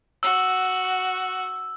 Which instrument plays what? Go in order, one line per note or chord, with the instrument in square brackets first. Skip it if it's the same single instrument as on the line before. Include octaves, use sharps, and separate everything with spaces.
[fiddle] F#4 [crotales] E6